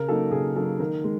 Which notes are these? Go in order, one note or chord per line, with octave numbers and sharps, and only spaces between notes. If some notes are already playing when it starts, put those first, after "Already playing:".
Already playing: C#3 A#4
F#3 A#3 D#4 A4
C#3 G#4
F#3 A#3 D#4 A4
D#3 A#4
G#3